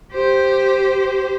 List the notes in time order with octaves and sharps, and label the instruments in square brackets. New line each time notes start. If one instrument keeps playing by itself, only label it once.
[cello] G4 C5